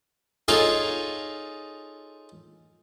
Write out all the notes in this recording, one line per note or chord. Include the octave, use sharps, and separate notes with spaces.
D#4 F4 G#4 A4 C#5 D#5